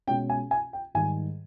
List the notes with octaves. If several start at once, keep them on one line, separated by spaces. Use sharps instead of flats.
B2 G#3 C#4 G5
G#5
G#5
G5
G#2 D#3 G3 G#5